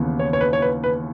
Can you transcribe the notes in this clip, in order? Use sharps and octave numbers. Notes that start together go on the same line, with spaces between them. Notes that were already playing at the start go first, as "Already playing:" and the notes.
Already playing: D#2 C#3 E3 B3
C#5
C#5
B4
C#5
B4
B4